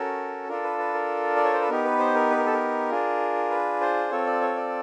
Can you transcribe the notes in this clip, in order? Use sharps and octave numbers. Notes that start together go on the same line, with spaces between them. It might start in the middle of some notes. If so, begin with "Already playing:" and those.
Already playing: C#4 F#4 A4 A#4
D4 F4 A4 A#4
B4
B4
A#4
D5
C#5
C5
B4
B3 D#4 G4 A#4
B4
C5
A#4
B4
A#4
A4
A#4
D4 F4 G#4
B4
C5
C4 F4 A4 C#5
D5
C#5
D5